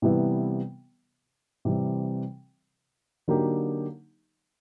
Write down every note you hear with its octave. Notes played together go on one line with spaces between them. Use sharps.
C3 E3 G3 B3 E4
C3 E3 G3 C4
D3 F#3 A#3 D#4 G4